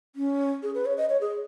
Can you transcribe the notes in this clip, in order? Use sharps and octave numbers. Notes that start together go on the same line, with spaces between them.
C#4
G#4
B4
C#5
D#5
C#5
G#4